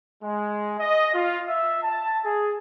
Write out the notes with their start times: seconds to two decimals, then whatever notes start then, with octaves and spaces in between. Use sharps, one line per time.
0.23 G#3
0.79 D#5
1.13 F4
1.47 E5
1.82 A5
2.24 G#4